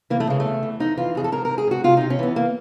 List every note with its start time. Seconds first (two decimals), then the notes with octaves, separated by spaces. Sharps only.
0.10 E3 A#3
0.20 A3
0.27 C#3 G#3
0.40 A3
0.45 E2
0.63 E3
0.80 F2 D#4
0.97 E3 F4
1.15 F2 G#4
1.24 A4
1.32 G#2 A#4
1.45 G#2 A#4
1.58 G#4
1.67 G#2 F#4
1.84 C3 F4
1.97 C3 D#4
2.10 C#4
2.19 E3 B3
2.36 A#3